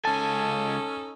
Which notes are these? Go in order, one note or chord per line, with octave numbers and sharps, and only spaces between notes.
C#2 C#4 D#4 A4 G#5 A5